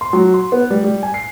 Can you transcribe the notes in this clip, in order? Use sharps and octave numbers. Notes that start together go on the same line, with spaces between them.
C6
F#3
C6
B3
G3
G3
G#5
C7